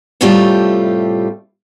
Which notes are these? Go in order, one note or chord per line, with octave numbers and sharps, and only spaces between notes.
A2 C3 G3 A3 F4 G4